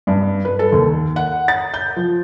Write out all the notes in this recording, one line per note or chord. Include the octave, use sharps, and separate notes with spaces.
G2
B4
A4
D#2
F#5
A6
G6
F3